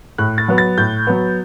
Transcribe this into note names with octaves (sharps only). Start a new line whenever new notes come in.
A2 F#6
A6
F#3 B3
A6
A2 G6
F#3 B3